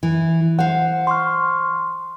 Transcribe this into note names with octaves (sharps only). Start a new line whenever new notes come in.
E3
C5 F5 F#5
C6 C#6 F6